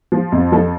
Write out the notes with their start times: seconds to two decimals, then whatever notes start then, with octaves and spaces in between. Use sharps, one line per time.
0.12 F3
0.32 F2
0.52 F3 A4